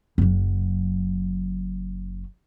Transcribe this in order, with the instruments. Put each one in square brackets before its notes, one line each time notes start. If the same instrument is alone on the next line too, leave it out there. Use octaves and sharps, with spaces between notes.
[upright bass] F#1 F#3